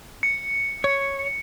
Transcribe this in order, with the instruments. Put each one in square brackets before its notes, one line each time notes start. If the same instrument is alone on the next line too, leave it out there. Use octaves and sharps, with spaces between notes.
[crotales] C#7
[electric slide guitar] C#5